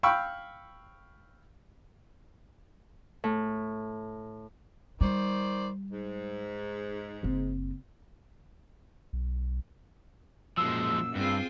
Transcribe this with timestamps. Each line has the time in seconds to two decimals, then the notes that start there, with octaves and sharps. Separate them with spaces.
0.03 F5 G5 B5 C#6 E6
3.24 A2
5.01 D#3 G3 C5 D5
5.90 G#2
7.23 F#1 C4
9.13 B1
10.57 F#2 A#2 F3 G#3 E6
11.15 G2 C4 F4 G#4